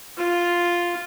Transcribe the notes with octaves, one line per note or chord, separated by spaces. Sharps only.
F4